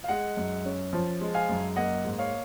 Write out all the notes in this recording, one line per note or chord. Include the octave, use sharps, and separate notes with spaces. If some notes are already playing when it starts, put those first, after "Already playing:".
F5
G#3 D#5 F#5
F#2
C#4
F3
G#3
F5 G#5
F#2
A#3 D#5 F#5
G#2
C#5 F5